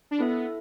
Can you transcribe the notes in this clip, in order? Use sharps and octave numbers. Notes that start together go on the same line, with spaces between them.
D4
B3 E4 A4 E5